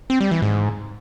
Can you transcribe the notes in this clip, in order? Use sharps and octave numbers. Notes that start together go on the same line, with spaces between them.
C4
G3
E3
G#2